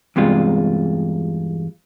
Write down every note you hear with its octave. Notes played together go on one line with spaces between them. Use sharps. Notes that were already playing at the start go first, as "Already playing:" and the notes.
E2 G2 C3 G#3 F4